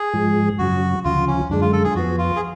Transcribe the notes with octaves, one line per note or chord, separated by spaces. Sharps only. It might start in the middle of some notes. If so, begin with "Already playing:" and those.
Already playing: G#4
G#2 F3 G#3
F#2 C#3 F#3 F#4
D2 C#3 F3 F4
C#4
F#2 D3 G#3 D4
F4
A4
G#4
F2 F3 B3 F#4
F4
G#4